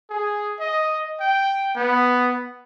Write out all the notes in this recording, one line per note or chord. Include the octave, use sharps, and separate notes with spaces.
G#4
D#5
G5
B3